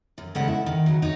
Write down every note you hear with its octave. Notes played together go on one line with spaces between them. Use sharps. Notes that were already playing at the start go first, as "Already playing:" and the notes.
F#2
G2 C#3 G#3 C#4 A4 F#5
E4
D#3
C#3 F#3
D#4 C#5